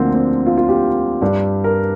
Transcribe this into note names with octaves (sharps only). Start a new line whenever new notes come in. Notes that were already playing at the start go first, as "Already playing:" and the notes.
Already playing: D2 D3 F3 A#3 C4 D4 C5
C4
F4
F4
G4
G2 G3
A#4